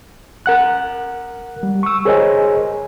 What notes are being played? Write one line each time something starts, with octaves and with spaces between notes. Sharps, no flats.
A#4 F#5 F#6
G3
C#6 E6
G#4 A#4 C5 C#5 D#5 G#5